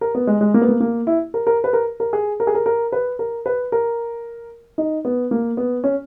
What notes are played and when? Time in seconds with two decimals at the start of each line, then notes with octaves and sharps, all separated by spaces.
0.01 A#4
0.15 B3
0.27 G#3
0.41 G#3
0.54 A#3
0.61 B3
0.69 A#3
0.80 A#3
1.07 E4
1.34 A#4
1.47 A#4
1.64 B4
1.73 A#4
2.00 A#4
2.13 G#4
2.40 A#4
2.47 G#4
2.55 A#4
2.66 A#4
2.92 B4
3.19 A#4
3.46 B4
3.72 A#4
4.78 D#4
5.05 B3
5.31 A#3
5.57 B3
5.84 C#4